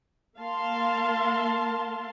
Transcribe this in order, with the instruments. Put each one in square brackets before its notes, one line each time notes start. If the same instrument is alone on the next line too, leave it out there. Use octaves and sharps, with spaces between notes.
[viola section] A#3 A#4 F5 A5 C6